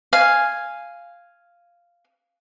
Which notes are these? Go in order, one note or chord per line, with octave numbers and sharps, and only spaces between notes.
F5 G#5